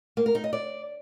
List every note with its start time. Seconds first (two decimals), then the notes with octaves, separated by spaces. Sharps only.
0.17 A#3
0.26 A#4
0.35 D#4
0.44 D#5
0.53 D5